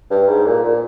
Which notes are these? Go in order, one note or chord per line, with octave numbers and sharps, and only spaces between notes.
G2
G#2
A#2
A#2